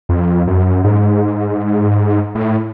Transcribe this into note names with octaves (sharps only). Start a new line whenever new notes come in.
F2
F#2
G#2
A2